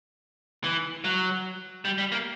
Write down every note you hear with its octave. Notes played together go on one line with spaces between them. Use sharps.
E3
F#3
G3
G3
A#3